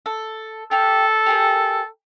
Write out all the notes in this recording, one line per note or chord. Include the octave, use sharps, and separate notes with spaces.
A4
G4 A4 D6 F6
G4 G#4 A#4